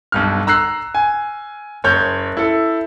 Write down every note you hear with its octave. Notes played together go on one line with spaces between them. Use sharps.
B1 G2 F6
A#5 E6 F#6 C7
G#5
F#1 C#5 G6
E4 A4